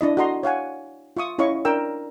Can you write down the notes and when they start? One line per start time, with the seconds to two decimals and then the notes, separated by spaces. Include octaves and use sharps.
0.01 D4 E4 D#5
0.17 F#4 A4 D#5 A#5 C6
0.43 C#5 F5 F#5 G#5
1.17 F4 E5 C#6 D#6
1.38 C#4 E4 C#5 D#5 F5 C#6
1.65 D4 A#4 G5 E6